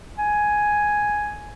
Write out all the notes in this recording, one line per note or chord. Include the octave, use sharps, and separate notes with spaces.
G#5